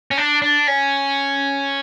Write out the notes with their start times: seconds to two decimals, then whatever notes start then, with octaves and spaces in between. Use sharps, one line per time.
0.11 C#4
0.18 D4
0.42 D4
0.67 C#4